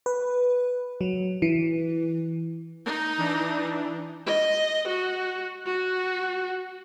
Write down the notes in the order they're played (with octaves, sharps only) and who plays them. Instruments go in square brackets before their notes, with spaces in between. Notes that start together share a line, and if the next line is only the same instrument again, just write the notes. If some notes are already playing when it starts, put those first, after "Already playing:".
[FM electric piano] B4
F#3
E3
[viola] D#4
[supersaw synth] E3 D4
[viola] D#5
F#4
F#4